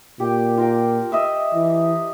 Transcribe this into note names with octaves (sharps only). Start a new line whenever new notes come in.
A#2 G4 G5
F4 A#4 G5
D#5 E5 E6
E3